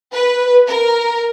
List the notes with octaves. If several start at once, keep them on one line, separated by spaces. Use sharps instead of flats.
B4
A#4